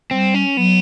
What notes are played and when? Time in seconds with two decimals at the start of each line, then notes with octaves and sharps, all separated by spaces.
0.11 G3 C4
0.34 C#4
0.57 F#3 B3